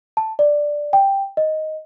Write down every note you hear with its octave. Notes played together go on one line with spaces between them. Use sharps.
A5
D5
G5
D#5